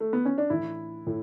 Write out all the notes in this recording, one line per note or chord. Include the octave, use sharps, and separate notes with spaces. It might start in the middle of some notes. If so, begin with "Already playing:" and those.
A3
B3
C#4
D4
A2 E3 E4
A2